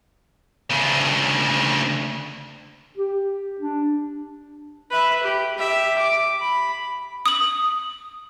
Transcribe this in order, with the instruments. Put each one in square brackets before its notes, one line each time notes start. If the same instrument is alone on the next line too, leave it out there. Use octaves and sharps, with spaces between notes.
[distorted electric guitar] D2 C#3
[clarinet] G4
D4
[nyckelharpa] B4 E5
G4
G4 E5
D6
B5
[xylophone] D#6 F#7